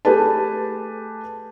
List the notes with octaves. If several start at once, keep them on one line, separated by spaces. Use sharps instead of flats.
A3 G4 G#4 B4 A5